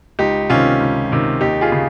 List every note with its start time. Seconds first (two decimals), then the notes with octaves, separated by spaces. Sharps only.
0.19 C#2 D#4 G4
0.50 C3 D#3 C#4 F4
0.80 C#2
1.11 C3 D#3
1.41 D#2 D#4 G4
1.61 F4 G#4
1.72 C#3